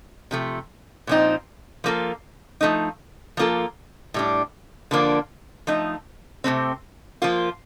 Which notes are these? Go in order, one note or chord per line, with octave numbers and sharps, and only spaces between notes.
C3 F3 A3
A#2 F3 C4 D#4
F3 A#3 F4 A4
F3 A3 D#4
F3 A#3 F4 A4
A2 G3 D4
D3 F3 A#3 D4
F3 A3 D#4
C3 D#3 A3 C4
F3 A#3 F4